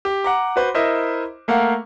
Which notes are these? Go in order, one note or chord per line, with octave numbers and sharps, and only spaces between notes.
G4
F#5 A#5 D6
F#4 B4 C5
E4 A#4 C5 D#5 E5
A3 A#3 A#4 F5 F#5